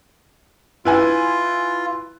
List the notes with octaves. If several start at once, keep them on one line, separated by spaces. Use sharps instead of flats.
E4 F4 B4 G#5